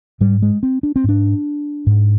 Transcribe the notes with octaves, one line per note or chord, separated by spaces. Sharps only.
G#2 G3
G#3
C4
D4
C4
G#2 D4
G#2